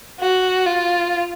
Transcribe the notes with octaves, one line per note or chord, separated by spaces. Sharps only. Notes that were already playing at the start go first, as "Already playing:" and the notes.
F#4
F4